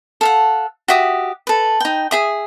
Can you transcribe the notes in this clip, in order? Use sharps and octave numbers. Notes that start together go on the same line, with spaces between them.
A4 F5 F#5
F#4 G4 E5 D#6
A4 B4
D#4 G5
G#4 E5 D#6